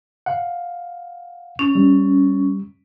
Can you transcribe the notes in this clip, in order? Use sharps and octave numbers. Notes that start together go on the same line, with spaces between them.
F5 F#5
C#4
G3